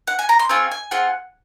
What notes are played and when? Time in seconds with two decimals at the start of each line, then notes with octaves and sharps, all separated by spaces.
0.08 F#5
0.19 G#5
0.29 A#5
0.39 C6
0.49 C4 F4 G#4 C#6
0.71 G#5
0.91 C4 F4 G#4 F#5